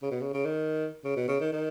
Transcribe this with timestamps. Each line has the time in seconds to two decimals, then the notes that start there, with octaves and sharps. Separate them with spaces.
0.02 C#3
0.11 B2
0.22 C#3
0.34 C#3
0.45 D#3
1.04 C#3
1.16 B2
1.28 C#3
1.41 D#3
1.52 D#3